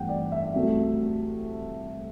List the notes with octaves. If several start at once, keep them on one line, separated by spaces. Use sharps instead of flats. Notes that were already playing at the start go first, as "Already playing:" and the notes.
Already playing: G2 E3 A3 C4 F#5 G5
D5
E5
C2 C3 F#3 A3